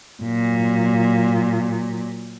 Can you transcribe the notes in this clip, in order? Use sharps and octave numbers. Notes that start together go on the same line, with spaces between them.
A#2 F#3